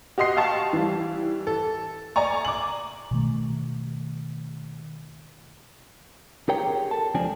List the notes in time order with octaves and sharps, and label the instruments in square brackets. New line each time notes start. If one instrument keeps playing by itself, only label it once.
[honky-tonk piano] F#4 G4 D#5 C6 C7
F5 G5 A5 C#6
E3 G3
A4
D5 G#5 A#5 C#6
D6 F#7
[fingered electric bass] B2 D#3 A3
[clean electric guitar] G4 G#4 A#4 C#5 G5
A4 A5
C#2 F3 C4 D4 G#5